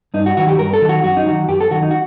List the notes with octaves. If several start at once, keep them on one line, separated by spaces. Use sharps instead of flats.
G2 D#4
F#4
D#3 F#3 F#4
G4
G2 A#4
A4
D#3 F#3
F#4
F#2 F#4
D#4
D#3 F#3 F#4
F#2 G4
A4
D#3 F#3 F#4
D#4
F#4